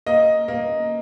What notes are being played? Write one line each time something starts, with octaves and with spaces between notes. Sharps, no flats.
A#3 D#5
A#3